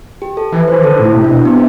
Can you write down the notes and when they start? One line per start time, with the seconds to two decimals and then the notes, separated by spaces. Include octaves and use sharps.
0.22 G4
0.37 A4
0.52 E3 B4
0.68 E3 C5
0.83 D3 A4
0.99 A2
1.04 E4
1.15 C3
1.24 D4
1.30 B2
1.45 C3 B3